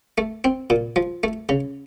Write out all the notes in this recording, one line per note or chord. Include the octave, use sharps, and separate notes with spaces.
A3
C4
A#2
F3
A3
C#3